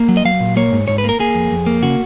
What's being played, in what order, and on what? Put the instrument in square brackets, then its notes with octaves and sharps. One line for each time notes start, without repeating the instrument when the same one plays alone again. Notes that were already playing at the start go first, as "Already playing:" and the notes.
Already playing: [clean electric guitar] A#3
F#3
D#5
F#3 F5
A#2
A#3 C#5
G#2
G#2 C#5
B4
A#3 A#4
A#3 G#4
F2
F2
A#3
C#3 F#4